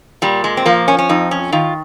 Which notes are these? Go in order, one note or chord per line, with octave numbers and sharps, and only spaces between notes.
A#2 G3
G#3
C4
F3 A#3
C#4
C#4
F2 D#4
C#4
D#3 F4